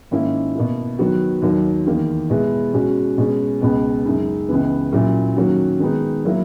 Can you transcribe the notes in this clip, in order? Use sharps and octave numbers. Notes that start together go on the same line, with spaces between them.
G#2 D#3 A#3 C#4 E4
B2 A#3 E4
D#3 F#3 B3 F#4
D#2 D#3 F#3 A#3
E2 D#3 A#3
B2 G#3 B3 E4
B2 G#3 C#4 F#4
B2 G#3 C#4
C#2 B2 G#3 B3
F#2 C#3 G#3 D#4
C#2 C#3 E3 B3
A#2 F#3 C#4 E4
D#3 F#3 A#3 C#4 F#4
D#3 G#3 B3 D#4
F#3 A#3 E4